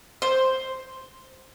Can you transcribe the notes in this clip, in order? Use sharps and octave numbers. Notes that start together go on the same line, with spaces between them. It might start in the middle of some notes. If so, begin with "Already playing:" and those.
C5